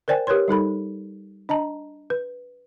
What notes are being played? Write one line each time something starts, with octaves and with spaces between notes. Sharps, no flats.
A#4 C5 D5 G5 G#5
G4 A#4 B4 C#5 C6
G3 D#4 A4 B5
D4 D#5 A5 A#5
B4